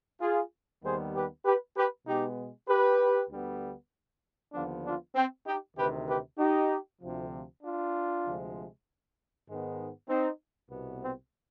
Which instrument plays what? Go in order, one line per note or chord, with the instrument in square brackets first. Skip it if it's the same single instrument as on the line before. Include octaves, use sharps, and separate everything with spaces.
[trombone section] F4 G#4
D#2 D#3 G3 B3 G#4 C5
G4 B4
G4 B4
G4 B4
B2 G#3 B3 D#4 G4
G4 B4
D2 D3 G3 B3
D#2 D3 F3 B3 D4 F4
D4 F4
C4
D#4 G4
D2 C3 D#3 G4 B4
G4 B4
D#4 G4
D2 C3 F3
D4 F4
D2 C3 F3 G#3
G#2 D#3 G#3 B3
C4 D#4
C2 B2 B3
C4